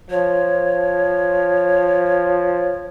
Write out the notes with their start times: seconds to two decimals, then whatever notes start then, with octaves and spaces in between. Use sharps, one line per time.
0.10 F3 C#5